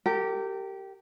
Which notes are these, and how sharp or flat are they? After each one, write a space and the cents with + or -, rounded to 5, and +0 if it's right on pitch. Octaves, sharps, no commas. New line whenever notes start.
G4 -15 A#4 -35